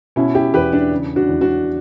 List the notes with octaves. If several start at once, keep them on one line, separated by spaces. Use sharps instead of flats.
B2 C#4 E4
E4 G4
E2 G4 B4
D4
C#3
D4 F#4
E2
D4 F#4